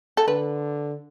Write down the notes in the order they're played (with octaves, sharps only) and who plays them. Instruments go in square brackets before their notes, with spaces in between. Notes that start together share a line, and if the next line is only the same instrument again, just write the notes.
[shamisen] A4
[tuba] D3 [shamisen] B4